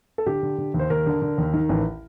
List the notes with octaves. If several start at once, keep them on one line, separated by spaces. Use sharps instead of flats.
A4
D3 G4
D3
D3
D#2
C5
D#2 A#4
D3
D3
D#2
D#3
A1